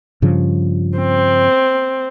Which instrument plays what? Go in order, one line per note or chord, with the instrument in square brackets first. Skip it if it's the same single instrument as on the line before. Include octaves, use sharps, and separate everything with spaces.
[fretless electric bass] G2 C#3 F3
[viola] C4